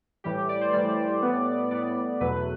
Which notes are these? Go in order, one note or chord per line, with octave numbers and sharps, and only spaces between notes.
A2 E3 G3 G4
D5
C5
A2 E3 G3 D5
A2 G3 B3
A2 G3 B3 D5
E2 B2 F#3 A3 B4
B4